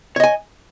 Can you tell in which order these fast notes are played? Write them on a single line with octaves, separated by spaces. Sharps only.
C#5 D#5 G#5